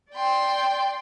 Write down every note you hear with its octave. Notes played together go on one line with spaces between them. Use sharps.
D5 G5 C6